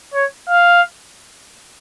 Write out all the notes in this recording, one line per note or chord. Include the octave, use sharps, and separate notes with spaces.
C#5
F5